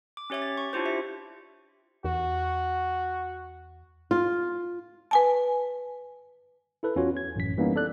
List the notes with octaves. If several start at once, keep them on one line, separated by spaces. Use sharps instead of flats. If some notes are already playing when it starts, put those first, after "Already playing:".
D6
C#4 G4 C#5 E5 D6
A6
C#6
D4 E4 F4 G4 C5
G4 E5
E2 F#4
F4
B4 G#5 A5
E4 A4 B4
E2 C#4 F4 F#4 C#5
G#6
A1 F#2 B6
E3 G3 A#3 B3 C#4 D#4
A4 D5 F#6